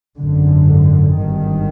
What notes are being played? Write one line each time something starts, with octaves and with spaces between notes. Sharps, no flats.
G#1 F#2 D3
G#1 G2 D#3